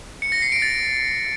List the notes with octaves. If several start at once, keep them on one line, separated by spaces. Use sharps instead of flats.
C#7
A#6
C7
D7
A6